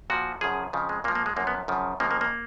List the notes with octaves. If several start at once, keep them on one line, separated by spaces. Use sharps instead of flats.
A#2 F3 F#4
F#2 C#3 F3 G#4
F2 C#3 F3
G#3
A#2 F3 A#3
A#3
G#3
F#2 F3 A#3
B3
F#2 C#3 F3
F2 C#3 F3 A#3
A#3
A#3